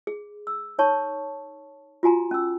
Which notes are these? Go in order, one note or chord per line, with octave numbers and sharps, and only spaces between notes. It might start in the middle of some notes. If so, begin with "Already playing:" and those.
G#4
E6
D#4 C#5 A5 C#6
F4 F#4 G#5 A#5
C#4 E6